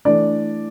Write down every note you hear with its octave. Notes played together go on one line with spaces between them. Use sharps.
E3 A3 D4 D5